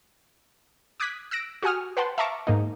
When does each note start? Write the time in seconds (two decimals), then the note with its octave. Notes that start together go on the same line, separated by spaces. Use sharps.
1.00 D6 D#6 F#6 G#6 B6
1.31 E6 F#6 A#6 D7
1.62 F#4 G4 F#5 G#5 D#6 F6
1.97 B4 C5 F#5 G5 A5 C6
2.18 E5 F5 A5 A#5 C#6 D6
2.47 G#2 A#3 D#4